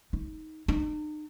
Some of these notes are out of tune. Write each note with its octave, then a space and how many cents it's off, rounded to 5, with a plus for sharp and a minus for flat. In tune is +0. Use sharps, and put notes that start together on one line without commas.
D#4 +15
D#4 -40